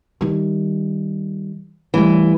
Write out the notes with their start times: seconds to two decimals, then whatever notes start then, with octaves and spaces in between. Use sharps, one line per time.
0.21 D#3 G3
1.94 E3 G3 A3